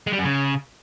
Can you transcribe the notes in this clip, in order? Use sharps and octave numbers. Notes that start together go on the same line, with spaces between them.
G#3
G3
F#2
C#3